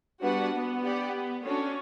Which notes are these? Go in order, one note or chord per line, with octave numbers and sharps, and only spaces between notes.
G3 B3 D4 F#4 B4 F#5
B3
G4 D5 F#5
C#4 D4 F#4 A4 C#5